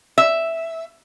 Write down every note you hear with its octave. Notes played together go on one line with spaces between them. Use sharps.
E5